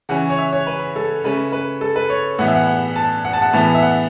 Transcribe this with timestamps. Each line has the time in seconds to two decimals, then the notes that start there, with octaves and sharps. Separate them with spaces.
0.09 C#3 E3 C#4 F#5
0.30 C#5
0.38 E5
0.53 C#5
0.66 B4
0.96 A4
1.24 C#3 A3 C#4 B4
1.52 B4
1.81 A4
1.96 B4
2.10 C#5
2.39 A2 E3 B3 F#5
2.48 E5
2.55 F#5
2.67 F#5
2.96 A5
3.25 F#5
3.33 A5
3.42 F#5
3.53 A2 E3 B3 A5
3.75 E5
3.83 F#5